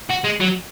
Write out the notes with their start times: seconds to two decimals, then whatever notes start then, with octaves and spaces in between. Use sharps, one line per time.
0.10 F#4
0.24 G#3
0.40 F#3